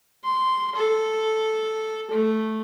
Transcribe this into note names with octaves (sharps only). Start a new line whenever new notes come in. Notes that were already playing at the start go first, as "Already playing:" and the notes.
C6
A4
A3